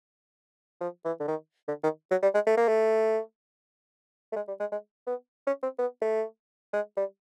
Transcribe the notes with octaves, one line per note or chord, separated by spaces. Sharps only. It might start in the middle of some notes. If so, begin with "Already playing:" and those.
F3
E3
D3
D#3
D3
D#3
F#3
G3
G#3
A3
A#3
A3
A3
G#3
G3
G#3
G#3
B3
C#4
C4
B3
A3
G#3
G3